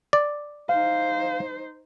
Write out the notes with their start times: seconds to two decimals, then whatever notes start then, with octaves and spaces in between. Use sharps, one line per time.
0.13 D5
0.69 D#4 C5 F5